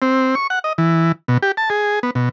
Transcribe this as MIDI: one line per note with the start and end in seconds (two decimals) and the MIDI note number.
0.02 0.35 60
0.35 0.47 85
0.50 0.59 78
0.64 0.73 75
0.78 1.12 52
1.28 1.38 47
1.42 1.52 67
1.57 1.69 81
1.70 1.99 68
2.03 2.11 59
2.15 2.29 47